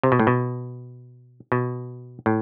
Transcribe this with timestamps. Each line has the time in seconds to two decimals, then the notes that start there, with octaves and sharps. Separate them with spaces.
0.03 C3
0.12 B2
0.19 A2
0.27 B2
1.52 B2
2.26 A2